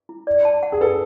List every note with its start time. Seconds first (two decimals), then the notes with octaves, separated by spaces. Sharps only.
0.09 E4
0.27 D5
0.45 A5
0.63 F#5
0.72 G#4
0.81 A4 B4